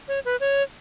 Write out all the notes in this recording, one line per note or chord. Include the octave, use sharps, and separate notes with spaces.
C#5
B4
C#5